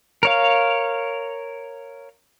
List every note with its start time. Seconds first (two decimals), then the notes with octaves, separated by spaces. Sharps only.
0.23 A#4 C#5 F5